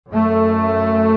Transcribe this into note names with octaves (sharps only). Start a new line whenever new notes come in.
F#2 A3